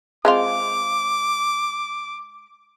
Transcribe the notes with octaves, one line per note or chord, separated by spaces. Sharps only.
G#3 C4 F4 D6